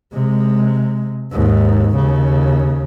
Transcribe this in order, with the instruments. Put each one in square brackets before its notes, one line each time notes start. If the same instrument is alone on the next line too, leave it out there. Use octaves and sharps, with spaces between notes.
[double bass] C3 G#3
D#2 G#2
D#2 C#3